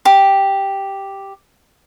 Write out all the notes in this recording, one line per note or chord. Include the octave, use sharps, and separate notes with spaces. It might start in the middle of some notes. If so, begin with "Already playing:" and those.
G4 D6